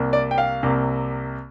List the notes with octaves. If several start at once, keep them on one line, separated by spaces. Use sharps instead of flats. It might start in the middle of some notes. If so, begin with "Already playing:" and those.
Already playing: C2 C3 A#3
D5
G5
F5
C2 C3 A#3